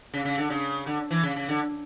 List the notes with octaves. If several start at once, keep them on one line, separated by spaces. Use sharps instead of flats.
C#3
C#3
D3
C#3
D3
E3
C#3
C#3
D3